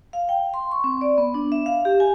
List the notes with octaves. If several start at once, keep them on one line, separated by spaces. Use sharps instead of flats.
F5
G5
C6
C#6
C4
D5
B3
D4
E5
F5
G4
G#5